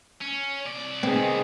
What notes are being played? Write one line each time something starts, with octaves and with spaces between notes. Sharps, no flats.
C#4
C2 D5
D#3 B3 C4 G#4